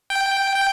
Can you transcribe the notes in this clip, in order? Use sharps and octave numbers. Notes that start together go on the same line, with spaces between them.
G5
G5